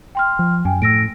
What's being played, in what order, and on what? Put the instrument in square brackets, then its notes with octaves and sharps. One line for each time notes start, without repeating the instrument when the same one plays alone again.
[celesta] G5 C6 F6
[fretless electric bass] F3
[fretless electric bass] F#2 [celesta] G5 G#5
[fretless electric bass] A2 [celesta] E6 A#6 D7